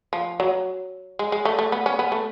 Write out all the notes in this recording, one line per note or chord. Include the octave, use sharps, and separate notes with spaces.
F3
F#3
G#3
G#3
A3
A3
B3
C#4
B3
A3